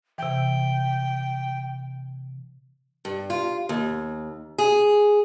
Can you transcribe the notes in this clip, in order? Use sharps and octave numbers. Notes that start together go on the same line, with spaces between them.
C3 E3 G5
G2
F4
D#2
G#4